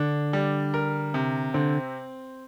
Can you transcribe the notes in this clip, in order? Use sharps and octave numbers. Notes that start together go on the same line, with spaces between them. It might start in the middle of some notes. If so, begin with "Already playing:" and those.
Already playing: D3 D4
G3
A#4
C3
D3 C4